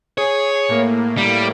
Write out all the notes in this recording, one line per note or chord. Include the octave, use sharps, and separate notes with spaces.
G#4 C#5
A2 A#3
G3